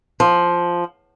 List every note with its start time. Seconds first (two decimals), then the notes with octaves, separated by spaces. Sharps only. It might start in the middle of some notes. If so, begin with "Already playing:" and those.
0.20 F3